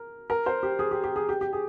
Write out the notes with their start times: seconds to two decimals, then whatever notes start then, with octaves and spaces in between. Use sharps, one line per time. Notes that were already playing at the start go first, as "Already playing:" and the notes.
Already playing: A#4
0.30 A#4
0.46 C5
0.63 G4
0.79 G#4
0.91 G4
1.04 G4
1.16 G#4
1.29 G4
1.41 G4
1.53 G#4